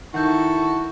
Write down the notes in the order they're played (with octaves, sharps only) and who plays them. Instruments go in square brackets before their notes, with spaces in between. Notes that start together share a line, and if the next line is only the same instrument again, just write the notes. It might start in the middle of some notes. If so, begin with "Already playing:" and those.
[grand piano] D#3 [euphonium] E4 [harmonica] F#4 A4 [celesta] F#5 G6